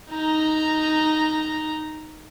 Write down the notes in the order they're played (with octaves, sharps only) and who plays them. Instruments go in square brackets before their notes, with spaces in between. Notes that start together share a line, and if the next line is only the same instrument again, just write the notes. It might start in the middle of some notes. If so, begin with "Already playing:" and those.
[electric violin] D#4 A#5